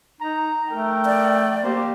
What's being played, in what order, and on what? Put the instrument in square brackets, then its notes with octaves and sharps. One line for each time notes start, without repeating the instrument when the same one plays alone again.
[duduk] D#4 [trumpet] A#5
[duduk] A3 [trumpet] A#4 [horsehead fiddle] G5
[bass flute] D5
[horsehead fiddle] A#3 G4 [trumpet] C5